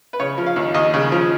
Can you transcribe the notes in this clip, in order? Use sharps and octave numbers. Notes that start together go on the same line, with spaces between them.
B4
C#3 C#5
F3
F5
D#2
D#2 D#5
C#3
F3